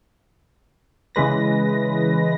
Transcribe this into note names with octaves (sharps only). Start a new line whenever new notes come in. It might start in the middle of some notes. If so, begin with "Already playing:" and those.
C#3 E3 G#3 B4 A#6